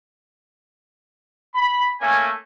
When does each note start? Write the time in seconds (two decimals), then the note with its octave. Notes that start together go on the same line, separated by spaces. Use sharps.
1.55 B5
2.01 A3 A#3 C#4 G#5